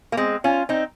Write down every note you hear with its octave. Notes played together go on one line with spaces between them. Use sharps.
A#3
G#3 C4
C#4 F4
C4 D#4